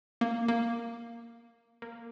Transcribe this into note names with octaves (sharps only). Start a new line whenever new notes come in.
A#3
A#3
A#3